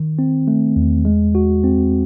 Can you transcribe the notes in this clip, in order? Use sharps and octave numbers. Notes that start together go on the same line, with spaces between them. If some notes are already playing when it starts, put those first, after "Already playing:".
Already playing: D#3
C4
A3
E2
G#3
F#4
C4